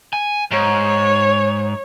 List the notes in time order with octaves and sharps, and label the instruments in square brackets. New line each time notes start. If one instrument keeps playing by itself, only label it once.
[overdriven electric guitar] G#5
[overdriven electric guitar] G#2 [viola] C#5